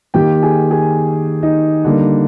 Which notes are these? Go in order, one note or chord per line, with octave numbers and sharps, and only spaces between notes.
D#3 A#3 G4 G5
G#4 G#5
G#4 G#5
D#4 D#5
D3 G3 A#3